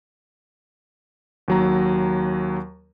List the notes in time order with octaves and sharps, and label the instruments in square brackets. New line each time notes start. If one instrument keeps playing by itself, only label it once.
[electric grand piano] D#2 F#3 A#5